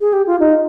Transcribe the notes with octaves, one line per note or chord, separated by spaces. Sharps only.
G#4
G4
F4
D#4